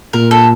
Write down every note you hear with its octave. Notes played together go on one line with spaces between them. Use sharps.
A#2 A#4
A4